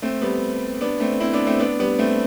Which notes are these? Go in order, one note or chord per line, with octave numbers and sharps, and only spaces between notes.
A3 C4
G3 B3
B3 D4
A3 C4
C4 E4
B3 D4
A3 C4
B3 D4
G3 B3
A3 C4